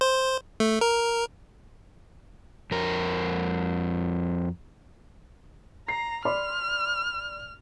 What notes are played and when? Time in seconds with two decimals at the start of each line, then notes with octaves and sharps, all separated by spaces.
0.01 C5
0.60 A3
0.81 A#4
2.71 F2 A#4
5.88 A#5 C7
6.25 D5 B5 C6 F6